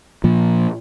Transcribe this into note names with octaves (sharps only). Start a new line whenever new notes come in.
A#2 F3